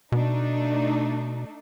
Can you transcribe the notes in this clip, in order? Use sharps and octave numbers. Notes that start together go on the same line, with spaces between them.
B2 A3 D4 D#4